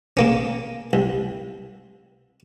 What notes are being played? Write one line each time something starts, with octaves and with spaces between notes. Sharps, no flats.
C#3 A#3 C#4
C2